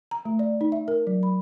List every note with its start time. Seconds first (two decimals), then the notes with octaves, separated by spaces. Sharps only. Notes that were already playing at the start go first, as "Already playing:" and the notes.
0.11 A#5
0.25 A3
0.39 D5
0.61 D#4
0.72 E5
0.88 A#4
1.07 F#3
1.23 B5